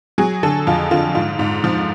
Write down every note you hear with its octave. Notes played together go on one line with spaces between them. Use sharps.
F#3 G#4
D3 A4
F2 F4
D3 F4
G#2 F4
G#2
F3